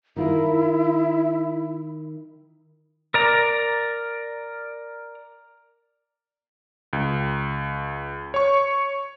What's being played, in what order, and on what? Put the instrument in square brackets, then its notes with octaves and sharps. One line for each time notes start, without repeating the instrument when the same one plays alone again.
[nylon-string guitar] D#3 F4 A#4 [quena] E4
[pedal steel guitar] A#4 D5 A#5
[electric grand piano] C#2
C#5 C#6